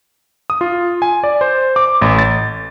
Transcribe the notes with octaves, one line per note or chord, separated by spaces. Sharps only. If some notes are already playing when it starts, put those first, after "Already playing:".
D#6
F4
G#5
D5
C5
D6
A1
A6